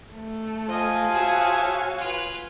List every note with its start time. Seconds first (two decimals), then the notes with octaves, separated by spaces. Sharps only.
0.14 A3
0.69 F3 D#5 F5 G#5
1.12 F#4 G#4 C#5 E5
1.99 F4 B4